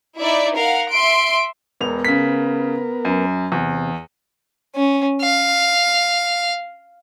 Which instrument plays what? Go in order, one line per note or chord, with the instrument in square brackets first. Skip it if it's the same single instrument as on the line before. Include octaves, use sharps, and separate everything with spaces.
[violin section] D#4 E4 D5 E5
A#4 F5 F#5
E5 C6 D7
[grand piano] E1 F7 [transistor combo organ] B3 A#4
[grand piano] C#3 B6
F#2
[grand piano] E2 [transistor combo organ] C3
[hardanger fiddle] C#4
F5